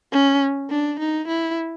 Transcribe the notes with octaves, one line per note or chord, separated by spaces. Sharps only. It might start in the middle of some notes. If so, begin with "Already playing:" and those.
C#4
D4
D#4
E4